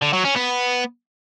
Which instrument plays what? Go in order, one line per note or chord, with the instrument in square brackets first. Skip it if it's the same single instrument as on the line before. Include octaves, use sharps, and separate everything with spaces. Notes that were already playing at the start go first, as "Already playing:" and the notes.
[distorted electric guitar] D3
F#3
C#4
B3